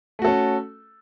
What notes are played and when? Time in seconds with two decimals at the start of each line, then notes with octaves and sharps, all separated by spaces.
0.19 A3
0.22 F#4
0.25 A4
0.27 C#4